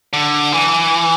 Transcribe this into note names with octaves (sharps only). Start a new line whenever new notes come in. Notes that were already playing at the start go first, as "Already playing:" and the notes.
D3
E3